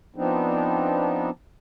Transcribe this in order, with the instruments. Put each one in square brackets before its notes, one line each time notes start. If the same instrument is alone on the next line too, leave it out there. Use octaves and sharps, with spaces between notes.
[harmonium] F3 B3 C4 D4 D#4